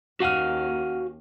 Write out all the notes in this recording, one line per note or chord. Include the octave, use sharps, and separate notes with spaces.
D#2 C#4 F#4 F5 F#5 G#5 F6